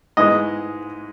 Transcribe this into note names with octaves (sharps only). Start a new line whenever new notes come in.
G#2 E3 G#3 D#5